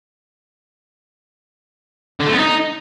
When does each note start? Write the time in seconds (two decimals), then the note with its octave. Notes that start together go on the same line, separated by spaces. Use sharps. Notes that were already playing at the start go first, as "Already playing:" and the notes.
2.20 D3
2.26 A3
2.32 B3
2.38 D#4